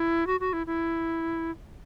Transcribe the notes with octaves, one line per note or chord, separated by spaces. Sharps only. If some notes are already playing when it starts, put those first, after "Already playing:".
Already playing: E4
F#4
F#4
E4
E4